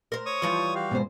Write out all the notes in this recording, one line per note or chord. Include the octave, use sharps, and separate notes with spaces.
A#4 C5
C#5 C#6 D#6
E3 F3 G3
F#4 G4 F5
B2 G#3 C5